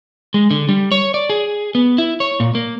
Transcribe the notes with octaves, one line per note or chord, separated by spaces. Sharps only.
G#3
D3
G3
C#5
D5
G#4
B3
E4
C#5
A#2
A#3